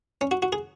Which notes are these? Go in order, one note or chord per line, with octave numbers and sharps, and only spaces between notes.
C#4
F#4
F#4
G#4